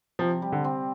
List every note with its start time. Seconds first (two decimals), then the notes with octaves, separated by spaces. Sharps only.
0.19 C3 F3
0.42 G3
0.52 D3
0.64 C4